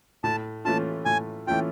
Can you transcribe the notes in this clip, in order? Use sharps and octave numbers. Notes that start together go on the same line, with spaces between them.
A2 A5
E3 A3 C#4 F4 A5
A2 G#5
E3 A3 C#4 F4 G5